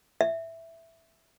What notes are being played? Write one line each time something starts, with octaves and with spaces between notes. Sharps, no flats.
E5